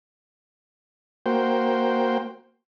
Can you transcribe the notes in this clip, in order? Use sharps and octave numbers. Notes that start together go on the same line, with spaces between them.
A#3 F#4 C5 G5